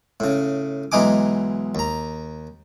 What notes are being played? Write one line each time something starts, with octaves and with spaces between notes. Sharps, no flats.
A2 C#3
B1 E3 G#3 D#4 G#5 D6
D#2 A#5